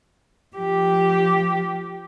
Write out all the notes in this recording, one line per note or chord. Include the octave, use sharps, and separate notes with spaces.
F3 G4